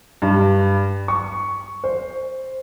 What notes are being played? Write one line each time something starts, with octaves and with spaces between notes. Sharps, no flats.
G2
C#6
C5